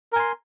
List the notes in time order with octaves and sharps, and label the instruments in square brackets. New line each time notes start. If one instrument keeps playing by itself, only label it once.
[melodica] A#4
G#5
C6